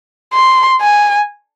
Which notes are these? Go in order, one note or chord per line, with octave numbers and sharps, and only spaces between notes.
C6
G#5